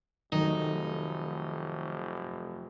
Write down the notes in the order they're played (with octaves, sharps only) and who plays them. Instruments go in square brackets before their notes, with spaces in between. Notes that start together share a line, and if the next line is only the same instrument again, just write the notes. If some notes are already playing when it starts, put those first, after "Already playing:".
[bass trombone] F1 [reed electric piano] D#3 [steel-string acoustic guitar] F#3 A3 [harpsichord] D#4